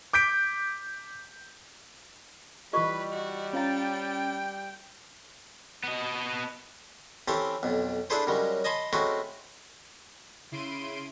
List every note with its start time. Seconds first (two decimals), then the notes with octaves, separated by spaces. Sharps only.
0.13 D6 G6 B6 D7
2.73 E3 G3 F4 G4 B4 D#5 C#6
3.12 F#4
3.53 C#4 F4 F5 G5 A#5 A6
5.84 B3 D#5
7.28 E3 C4 C#4 G4 A4
7.63 B1 F2
8.10 D4 E4 G#4 A4 B4 C5
8.27 F#2 C#3 G3 G#3
8.64 D#5 G#5 A5 B5 C6
8.93 G#3 A3 C4 C#4 F#4 B4
10.52 C#3 E4 C6 D7 D#7